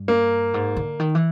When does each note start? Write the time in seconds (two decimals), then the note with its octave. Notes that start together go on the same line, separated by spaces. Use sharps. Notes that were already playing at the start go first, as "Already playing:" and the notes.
Already playing: G2
0.08 A#3
0.54 G#2
0.77 D3
1.00 D#3
1.15 E3